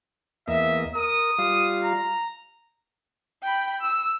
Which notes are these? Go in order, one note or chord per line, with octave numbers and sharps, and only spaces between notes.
E2 A#3 D#5 E5
A#4 D#6
G3 F4 F5
A#5
G5 B5
E6